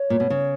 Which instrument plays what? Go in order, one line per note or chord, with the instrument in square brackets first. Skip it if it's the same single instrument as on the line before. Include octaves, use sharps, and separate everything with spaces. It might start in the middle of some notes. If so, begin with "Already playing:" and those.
Already playing: [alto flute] C#5
[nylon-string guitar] A#2
B2
C#3